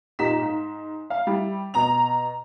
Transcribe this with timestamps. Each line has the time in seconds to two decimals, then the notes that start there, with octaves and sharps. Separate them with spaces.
0.19 A#2 D#4 G4 A#5 B6 E7
0.41 G#2
1.10 F5
1.27 G3 E4
1.74 B2 A#5 F7